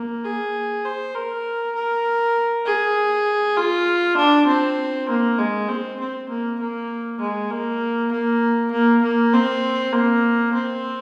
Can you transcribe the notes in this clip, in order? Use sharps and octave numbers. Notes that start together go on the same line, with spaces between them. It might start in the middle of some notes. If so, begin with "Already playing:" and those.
Already playing: A#3
G#4
C5
A#4
A#4
G#4
F4
D4
C4
A#3
G#3
C4
C4
A#3
A#3
G#3
A#3
A#3
A#3
A#3
C4
A#3
C4